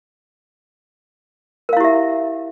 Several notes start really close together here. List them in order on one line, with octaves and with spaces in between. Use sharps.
A#4 F5 E4 G4 E5